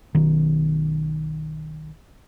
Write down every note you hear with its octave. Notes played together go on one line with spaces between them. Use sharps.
B1 D#3